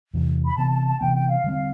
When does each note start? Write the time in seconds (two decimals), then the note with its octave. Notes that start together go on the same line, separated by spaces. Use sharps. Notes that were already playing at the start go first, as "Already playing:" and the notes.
0.14 E2 C3 E3
0.45 B5
0.57 C3 E3 B3 A5
0.71 A5
0.86 A5
1.01 C3 E3 B3 G5
1.16 G5
1.29 F5
1.44 D3 G3 C4